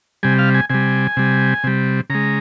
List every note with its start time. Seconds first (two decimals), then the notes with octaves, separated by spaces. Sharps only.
0.23 C3 G3 G#5
0.39 F5
0.54 G#5
0.70 C3 G3 G#5
1.17 C3 G3
1.64 C3 G3
2.10 C#3 G#3 A#5